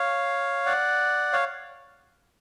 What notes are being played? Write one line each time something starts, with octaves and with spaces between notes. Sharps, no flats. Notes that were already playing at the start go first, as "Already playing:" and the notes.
Already playing: C#5 F5
D5 F#5
C#5 F5